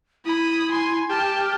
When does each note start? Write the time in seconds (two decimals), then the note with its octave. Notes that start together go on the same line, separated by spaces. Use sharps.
0.25 E4 B5 D#6
0.71 G#5 C6
1.10 G4 A5 F6